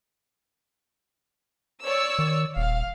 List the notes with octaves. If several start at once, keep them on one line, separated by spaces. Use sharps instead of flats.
C#5 D5 E6
D#3
D#1 F5